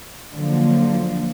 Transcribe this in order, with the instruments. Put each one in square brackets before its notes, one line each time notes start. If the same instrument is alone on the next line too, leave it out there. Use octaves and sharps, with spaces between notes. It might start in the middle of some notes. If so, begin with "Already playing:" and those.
[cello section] D3 F3 F#3 A#3